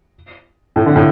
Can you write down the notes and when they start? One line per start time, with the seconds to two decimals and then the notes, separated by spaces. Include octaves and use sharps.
0.76 A2
0.86 D3
0.96 A2